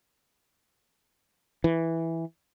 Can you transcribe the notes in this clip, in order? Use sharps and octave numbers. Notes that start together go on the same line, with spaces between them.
E3